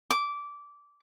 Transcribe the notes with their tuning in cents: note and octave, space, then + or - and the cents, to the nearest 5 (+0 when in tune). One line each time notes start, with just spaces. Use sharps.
D6 -15